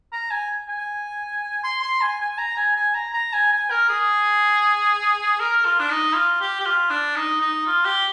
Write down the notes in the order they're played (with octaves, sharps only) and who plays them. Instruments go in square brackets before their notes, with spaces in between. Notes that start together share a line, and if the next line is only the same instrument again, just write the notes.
[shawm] A#5
G#5
G#5
C6
C6
G#5
G#5
A#5
G#5
G#5
A#5
A#5
G#5
G#5
A#4
G#4
A#4
F4
D4
D#4
F4
G4
G4
F4
D4
D#4
D#4
F4
G4